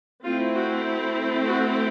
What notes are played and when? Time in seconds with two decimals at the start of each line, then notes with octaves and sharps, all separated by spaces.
0.24 A3 C4 E4 F4
0.55 F#4
1.47 F#4